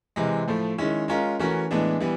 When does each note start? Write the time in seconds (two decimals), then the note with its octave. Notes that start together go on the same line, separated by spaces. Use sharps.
0.16 C3 E3 G#3
0.48 A2 F3 A3
0.78 D#3 G#3 C#4 E4
1.08 G#3 C#4 F4 A#4
1.39 E3 A3 C#4 F#4 A#4
1.71 A2 E3 G#3 B3 D4
2.00 E3 G3 B3